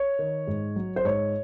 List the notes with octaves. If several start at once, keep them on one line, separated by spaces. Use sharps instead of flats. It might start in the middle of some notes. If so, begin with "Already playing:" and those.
Already playing: C#5
D#3
G#2
F#3
C5
G#2 C#5